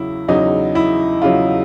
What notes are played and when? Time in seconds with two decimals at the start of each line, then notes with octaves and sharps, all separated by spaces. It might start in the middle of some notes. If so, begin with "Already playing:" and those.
Already playing: E2 C#3 F#3 E4
0.28 E2 C#3 F#3 D#4
0.75 E4
1.22 E2 C#3 F#3 F4